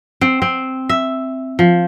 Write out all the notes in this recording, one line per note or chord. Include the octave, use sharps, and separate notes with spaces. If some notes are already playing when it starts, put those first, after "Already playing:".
C4
C4
E5
F3